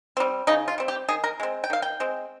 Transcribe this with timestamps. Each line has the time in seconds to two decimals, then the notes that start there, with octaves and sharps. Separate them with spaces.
0.17 G3 C4
0.47 C#3 D#4
0.68 F4
0.78 G3 C4
0.88 G4
1.09 D#3 G#4
1.24 A#4
1.40 G#3 C4
1.64 G5
1.70 D#3 F5
1.82 G5
2.00 G#3 C4